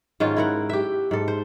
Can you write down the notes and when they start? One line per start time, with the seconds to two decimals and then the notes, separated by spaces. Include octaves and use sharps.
0.20 G#2 D#3 C#4 F4
0.36 E4 A#4 F#5
0.69 G4 E5
1.11 G#2 A4
1.28 C5